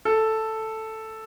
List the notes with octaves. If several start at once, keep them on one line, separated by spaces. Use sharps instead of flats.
A4